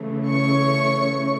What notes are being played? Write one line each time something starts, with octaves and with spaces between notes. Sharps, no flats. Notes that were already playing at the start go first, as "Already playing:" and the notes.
Already playing: C#3 E3 A3
C#5 C#6